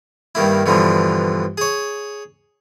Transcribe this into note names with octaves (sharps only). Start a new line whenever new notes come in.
G2 D#3 A#3 E4
G2 B2 D3 E3 F3
G#4 C#5